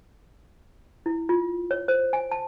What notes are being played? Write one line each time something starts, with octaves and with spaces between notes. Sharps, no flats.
E4
F4
C#5
C5
G#5
A5